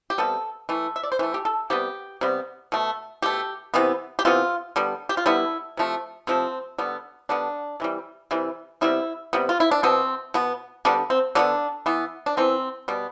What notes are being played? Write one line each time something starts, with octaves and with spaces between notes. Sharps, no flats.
G4
C3 G3 B3 A4
E3 A3
E5
D5
C5
E3 A3 B4
G4
A4
C3 G3 B3 G4
C3 G3 B3
B2 A3
B2 A3 G4
C3 E3 B3
G4
C3 E3 B3 F4
D3 G3 B3
G4
F4
D3 G3 B3 E4
C3 F3 A3
C3 F3 A3 C4
D3 G3 B3
D3 G3 B3 D4
C3 E3 G3
C3 E3 G3
C3 G3 B3 E4
C3 G3 B3
F4
E4
D4
B2 B3 C4
B2 B3
D3 G3 B3 D4
C4
D3 G3 B3 D4
E3 B3
D4
E3 B3 C4
B2 G3 B3